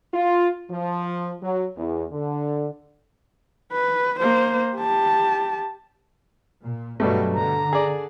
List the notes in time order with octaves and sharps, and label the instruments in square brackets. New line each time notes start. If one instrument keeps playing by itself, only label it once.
[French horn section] F4
F3
F#3
E2
D3
[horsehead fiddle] B4
A#3 C5
G4 A5
[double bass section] A#2
[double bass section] G2 F#3 [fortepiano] B2 G3 A3
[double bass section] D3 [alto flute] A#5
[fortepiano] G#4 D5